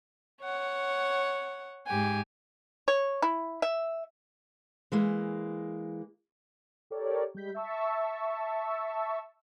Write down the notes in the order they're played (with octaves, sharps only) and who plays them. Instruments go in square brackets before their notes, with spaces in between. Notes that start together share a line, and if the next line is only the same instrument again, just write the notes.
[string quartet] C#5 F#5
G#2 G4 G#5
[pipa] C#5
E4
E5
[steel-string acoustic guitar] E3 G#3 A#3
[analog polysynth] G4 A4 A#4 C#5 D5
G3 G#3 G6 B6
E5 A5 C#6 E6